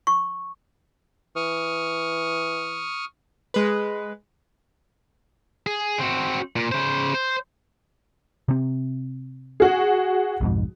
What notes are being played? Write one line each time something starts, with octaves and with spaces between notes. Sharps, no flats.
C#6
E3 C#6 D#6 F6
G#3 B4
G#4
C4 F#4
A#2
C#3 C5
C5
C3 C4
F#4 G#4
B1 F2 G#2